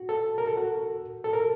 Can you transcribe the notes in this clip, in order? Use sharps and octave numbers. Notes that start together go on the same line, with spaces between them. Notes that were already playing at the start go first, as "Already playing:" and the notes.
Already playing: F#4
A4
A#4
A4
F#4
A4
A#4